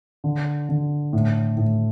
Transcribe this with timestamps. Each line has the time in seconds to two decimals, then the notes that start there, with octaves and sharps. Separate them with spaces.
0.24 D3
0.69 D3
1.13 A2
1.57 A2